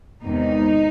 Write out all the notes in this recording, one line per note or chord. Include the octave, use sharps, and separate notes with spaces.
E2 C3 D#3 G#3 D#4